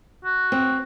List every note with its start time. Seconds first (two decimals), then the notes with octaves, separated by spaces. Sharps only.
0.25 F#4
0.52 C4